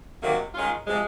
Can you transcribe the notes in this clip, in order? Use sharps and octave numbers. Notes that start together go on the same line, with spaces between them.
C3 D#3 F#3 A#3
D#3 G#3 C#4 F4
C3 F3 G#3